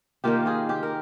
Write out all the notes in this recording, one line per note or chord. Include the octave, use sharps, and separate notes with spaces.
D#3 A#3 F4 G4
F4 G#4
G4
A#4